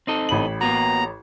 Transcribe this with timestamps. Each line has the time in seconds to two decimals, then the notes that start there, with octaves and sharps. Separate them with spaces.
0.07 C4 D#4 A4
0.29 A1 B5 F#7
0.61 A#3 B3 F#4 A#5